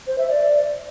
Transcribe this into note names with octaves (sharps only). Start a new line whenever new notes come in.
C5
E5
D5